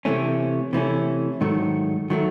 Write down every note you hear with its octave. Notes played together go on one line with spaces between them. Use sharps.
C3 E3 A3 C#4
C3 E3 A3 C#4
G#2 D#3 F#3 A3
D#3 F#3 A3